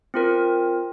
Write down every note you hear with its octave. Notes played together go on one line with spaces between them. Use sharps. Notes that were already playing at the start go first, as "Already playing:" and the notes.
C4 F4 A#4